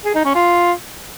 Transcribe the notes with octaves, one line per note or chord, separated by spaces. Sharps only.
G#4
D#4
C#4
F4